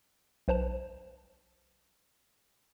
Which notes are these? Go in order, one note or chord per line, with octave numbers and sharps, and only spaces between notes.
B1 B4 C5 A5 E7